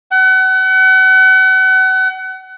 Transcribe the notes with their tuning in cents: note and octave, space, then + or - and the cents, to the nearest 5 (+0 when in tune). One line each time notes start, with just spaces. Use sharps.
F#5 +35